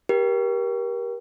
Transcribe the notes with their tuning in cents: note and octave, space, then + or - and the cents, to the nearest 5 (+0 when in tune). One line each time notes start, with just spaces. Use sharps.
G4 +0 A#4 +30